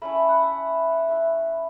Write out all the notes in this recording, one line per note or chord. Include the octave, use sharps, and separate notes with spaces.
A3 C#4 E4 B5
A5
F#5
E5
A3 E4